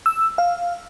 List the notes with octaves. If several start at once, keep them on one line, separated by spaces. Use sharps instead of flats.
E6
F5